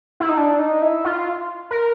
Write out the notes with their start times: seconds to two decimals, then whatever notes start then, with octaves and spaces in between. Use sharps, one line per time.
0.20 E4
0.29 D#4
0.37 D4
0.59 D#4
0.82 E4
1.05 F4
1.71 A#4